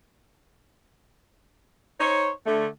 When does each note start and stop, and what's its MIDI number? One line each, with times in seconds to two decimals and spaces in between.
1.99 2.29 63
1.99 2.29 72
1.99 2.29 73
2.46 2.66 50
2.46 2.66 57